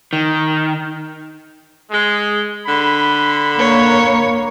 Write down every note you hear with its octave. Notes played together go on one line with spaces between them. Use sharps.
D#3
G#3
D3 B5
A#3 C#5